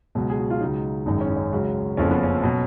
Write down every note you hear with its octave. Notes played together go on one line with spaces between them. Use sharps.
C#2 B2 F#3
G#4
F#4
F4
C#2 C#3 F#3 D#4
G#1 F#2 D#3 G#3 D#4
C#4
D#4
C#4
C#2 C#3 F#3
F#1 F2 C#3 F3 C#4
B3
C#4
B2 F#3